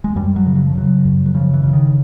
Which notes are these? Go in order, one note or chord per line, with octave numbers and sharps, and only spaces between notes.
G#3
F#2 G3
F#3
C#3
F#3
F3
C#3 F#3
F#2
F#3
C#3 F3
E3
C#3
E3
D#3